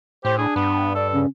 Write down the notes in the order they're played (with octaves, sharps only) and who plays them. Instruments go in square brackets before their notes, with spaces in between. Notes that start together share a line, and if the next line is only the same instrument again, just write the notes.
[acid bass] A2 [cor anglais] G4 [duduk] C5
[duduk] D4 [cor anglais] G#4
[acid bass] G2 [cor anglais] B3
[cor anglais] A4 [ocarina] D5
[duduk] C#3 [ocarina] C#4